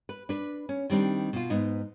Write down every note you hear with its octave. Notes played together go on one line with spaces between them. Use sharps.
B4
D4 B4
C#4
D#3 G3 C4 D4
B2 F4
G#2 B3 D#4